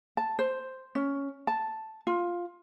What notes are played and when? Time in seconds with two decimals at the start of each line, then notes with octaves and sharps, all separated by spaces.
0.17 A5
0.39 C5
0.95 C#4
1.47 A5
2.07 F4